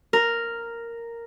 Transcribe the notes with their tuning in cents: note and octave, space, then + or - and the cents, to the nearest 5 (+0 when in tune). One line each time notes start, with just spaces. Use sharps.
A#4 -5